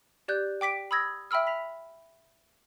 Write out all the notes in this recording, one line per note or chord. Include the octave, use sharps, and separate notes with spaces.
G4 D5 F#6 G6
G5 D6 B6 D7
B5 D#6 E6 G#6 A#6
E5 G5 B5 E6 F6
B5 B6 F7